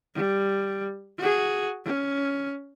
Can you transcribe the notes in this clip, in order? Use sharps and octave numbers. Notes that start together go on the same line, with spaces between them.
G3
F#4 G#4
C#4